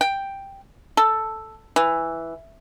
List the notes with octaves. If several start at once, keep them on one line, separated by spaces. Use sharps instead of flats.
G5
A4
E3